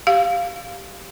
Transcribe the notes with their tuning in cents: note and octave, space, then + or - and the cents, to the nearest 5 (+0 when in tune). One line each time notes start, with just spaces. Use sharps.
G4 -5 F5 +0